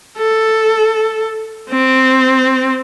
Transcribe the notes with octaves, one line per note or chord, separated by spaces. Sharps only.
A4
C4